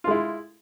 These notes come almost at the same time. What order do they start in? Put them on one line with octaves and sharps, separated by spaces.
F4 G#3 E4